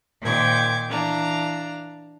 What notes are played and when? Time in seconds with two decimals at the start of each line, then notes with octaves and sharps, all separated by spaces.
0.21 A#2 D#3 C5 G5 D6 G#6
0.88 E3 D4 F5 A#5